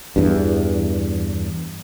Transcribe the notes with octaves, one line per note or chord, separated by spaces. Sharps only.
E2 G2